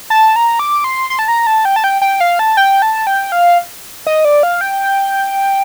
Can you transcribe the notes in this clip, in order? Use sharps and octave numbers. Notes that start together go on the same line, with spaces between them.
A5
A#5
D6
C6
C6
A5
A#5
A5
G5
A5
G5
G5
F5
A5
G5
A5
G5
F5
D#5
D5
F5
G5